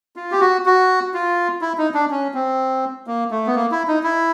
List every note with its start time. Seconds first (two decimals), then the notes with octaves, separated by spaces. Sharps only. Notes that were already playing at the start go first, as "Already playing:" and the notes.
0.16 F4
0.31 G4
0.41 F#4
0.66 F#4
1.14 F4
1.61 E4
1.78 D#4
1.94 D4
2.11 C#4
2.34 C4
3.07 A#3
3.31 A3
3.47 B3
3.55 A#3
3.72 E4
3.88 D#4
4.03 E4